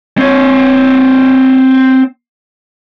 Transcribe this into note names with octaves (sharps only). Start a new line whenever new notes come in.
C4 C#5